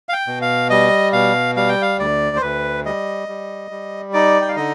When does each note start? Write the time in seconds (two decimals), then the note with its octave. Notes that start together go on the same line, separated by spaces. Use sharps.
0.09 F5
0.13 G5
0.27 B2
0.42 F5
0.70 G3 D#5
1.13 B2 F5
1.57 G3 F5
1.69 G5
1.82 F5
1.99 D2 D5
2.36 C5
2.42 D2 B4
2.85 G3 D#5
3.28 G3
3.71 G3
4.13 D#4 D5
4.41 G5
4.48 F5
4.56 D3 D#5